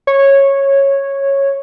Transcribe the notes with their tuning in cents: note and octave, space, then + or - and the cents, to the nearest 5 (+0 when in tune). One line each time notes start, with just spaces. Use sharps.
C#5 -10